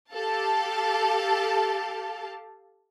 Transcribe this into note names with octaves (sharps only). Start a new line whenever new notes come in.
G4 A4 F5 A5